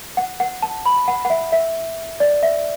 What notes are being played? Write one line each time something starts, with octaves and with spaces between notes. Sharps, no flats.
F#5
F#5
A5
B5
F#5
F#5
E5
E5
D5
E5